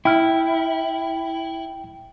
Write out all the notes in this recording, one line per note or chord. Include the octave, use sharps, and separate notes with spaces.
E4 G5 F6